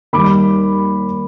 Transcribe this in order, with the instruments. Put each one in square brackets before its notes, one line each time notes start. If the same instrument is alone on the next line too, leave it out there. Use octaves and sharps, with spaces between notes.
[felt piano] D#2 D#3 G3 B5 D6